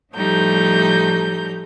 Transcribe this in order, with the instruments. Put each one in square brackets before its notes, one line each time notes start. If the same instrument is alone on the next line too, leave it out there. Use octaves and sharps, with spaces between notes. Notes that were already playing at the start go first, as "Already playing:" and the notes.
[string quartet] A2 F3 G3 A3 D#4 G6